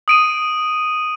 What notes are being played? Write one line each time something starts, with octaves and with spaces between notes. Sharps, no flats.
D#6 D7 D#7